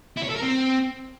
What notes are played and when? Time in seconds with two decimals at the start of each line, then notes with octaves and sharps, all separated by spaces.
0.17 E4
0.23 C#5
0.29 A4
0.35 A#4
0.42 C4